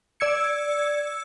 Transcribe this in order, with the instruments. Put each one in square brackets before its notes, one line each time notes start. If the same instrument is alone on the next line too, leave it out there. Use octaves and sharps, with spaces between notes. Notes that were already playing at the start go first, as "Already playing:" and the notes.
[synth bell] D5 E6 G#6 C#7